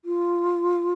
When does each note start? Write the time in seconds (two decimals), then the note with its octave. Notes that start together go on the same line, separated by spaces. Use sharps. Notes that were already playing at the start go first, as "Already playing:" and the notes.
0.05 F4